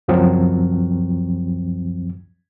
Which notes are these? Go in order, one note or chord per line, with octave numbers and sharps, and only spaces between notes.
C#2 F#2 F3 F#3 C4